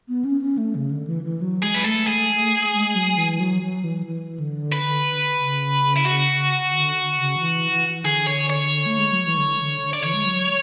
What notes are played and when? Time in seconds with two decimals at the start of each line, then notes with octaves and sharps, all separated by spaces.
0.08 B3
0.25 C#4
0.41 C#4
0.58 A3
0.75 C#3
0.91 D3
1.07 E3
1.24 E3
1.41 F#3
1.63 G#3 G#4
1.74 B4
1.85 A3 A4
2.07 G#4
2.74 G#3
2.95 F#3
3.17 E3
3.40 F#3
3.63 F#3
3.84 E3
4.06 E3
4.40 D3
4.72 B4
5.39 C#3
5.96 E4
6.05 F#4
6.72 D3
7.17 C#3
7.39 E3
7.72 E3
8.05 D3 G#4
8.26 C#5
8.50 C#5
8.86 A3
8.98 G#3
9.12 F#3
9.25 E3
9.37 D3
9.59 D3
9.81 D3
9.93 D5
10.03 E3 C#5
10.15 G#3
10.26 F#3